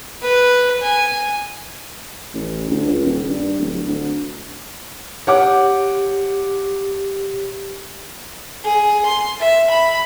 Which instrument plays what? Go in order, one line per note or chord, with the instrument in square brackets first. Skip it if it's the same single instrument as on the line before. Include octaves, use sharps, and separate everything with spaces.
[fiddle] B4
G#5
[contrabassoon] A1
D2
C#2
D#1
G2
D1
D2
[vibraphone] G4 [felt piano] C#5 F#5 D6
[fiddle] G#4
C6
E5
B5